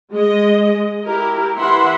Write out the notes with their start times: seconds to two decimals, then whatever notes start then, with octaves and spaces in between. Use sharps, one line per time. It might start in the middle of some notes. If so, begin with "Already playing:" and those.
0.13 G#3 D#5
1.05 E4 G4 A#4
1.56 E3 E5 F#5 B5 C6